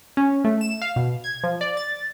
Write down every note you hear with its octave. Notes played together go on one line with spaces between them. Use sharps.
C#4
A3
E7
F5
B2
G#6
F3
D5
A6